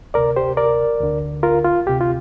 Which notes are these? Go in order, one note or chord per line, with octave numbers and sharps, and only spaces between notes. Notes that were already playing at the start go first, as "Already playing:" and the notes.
D2 C3 A#4 D5
G4 C5
A#4 D5
D2 D3
F4 A#4
F4
D2 C3 G4
F4